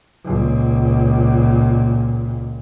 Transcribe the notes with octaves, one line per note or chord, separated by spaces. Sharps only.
C#2 A#2